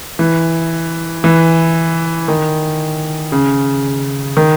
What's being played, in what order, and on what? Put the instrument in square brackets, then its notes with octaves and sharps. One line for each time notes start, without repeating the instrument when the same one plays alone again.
[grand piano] E3
E3
D#3
C#3
D#3